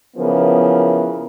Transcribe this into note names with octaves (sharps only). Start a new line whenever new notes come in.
C#3 E3 F3 B3 A#4